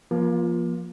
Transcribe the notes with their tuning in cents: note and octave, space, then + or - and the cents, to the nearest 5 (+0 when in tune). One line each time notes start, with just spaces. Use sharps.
F3 -10 A#3 +35 F4 +0